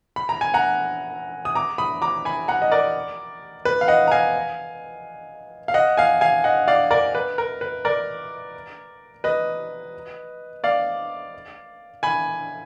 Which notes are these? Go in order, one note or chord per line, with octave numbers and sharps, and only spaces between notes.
B5
A#5
G#5
F#5 A#5
D#6
A#5 D6
B5 D#6
A#5 D6
G#5 B5
F#5 A#5
D#5
A#4 D5
B4
F5
D#5 F#5
A#5
F5 G#5
F5
D#5 F#5
F5 G#5
F5 G#5
D#5 F#5
D5 F5
A#4 D5
B4
A#4
B4
A#4 D5
B4 D#5
D5 F5
G#5 B5